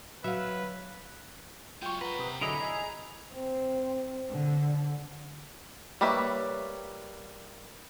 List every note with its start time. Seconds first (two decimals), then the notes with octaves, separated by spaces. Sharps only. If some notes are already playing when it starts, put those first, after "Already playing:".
0.24 F#3 B4 E5 F5
1.82 F#3 G#3 F4 G5 C#6
2.01 A#4 B4 F#5 A#5
2.19 C3 D#6
2.41 D3 F#3 E4 G#4 D#5 A#5 B5
2.60 G#4 D#5 G#5 E6
3.33 C4
4.30 D3
6.01 G3 A#3 B4 C#5 E5